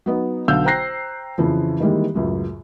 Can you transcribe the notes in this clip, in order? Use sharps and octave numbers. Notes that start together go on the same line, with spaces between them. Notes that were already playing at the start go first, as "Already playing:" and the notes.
F#3 B3 D#4
B1 D3 F5 E6 G6
C5 G5 A#5 F#6 A#6 C7
F2 C#3 E3 F3
D#3 E3 G3 G#3 A#3
C#2 F#2 A2